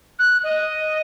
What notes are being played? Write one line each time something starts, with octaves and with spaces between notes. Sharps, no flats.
F#6
D#5